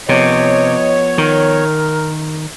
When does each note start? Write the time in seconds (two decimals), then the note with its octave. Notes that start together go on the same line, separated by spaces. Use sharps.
0.09 C3 F3 B3 C#5 D#5
1.18 D#3 A#4